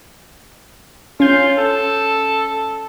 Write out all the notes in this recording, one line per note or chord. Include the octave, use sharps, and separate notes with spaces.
C#4 F4 G6
A4